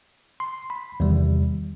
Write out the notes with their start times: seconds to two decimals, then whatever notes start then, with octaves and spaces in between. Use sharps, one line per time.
0.40 C6
0.70 B5
1.00 E2 C3 D#3 G3